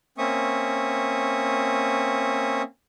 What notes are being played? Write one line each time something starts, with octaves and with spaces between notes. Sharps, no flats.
A#3 C4 C#4 E5 C#6 D#6